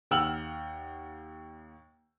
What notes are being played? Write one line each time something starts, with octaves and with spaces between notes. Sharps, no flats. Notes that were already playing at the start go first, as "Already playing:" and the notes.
D#2 F#5 G5 E6 F6 F#7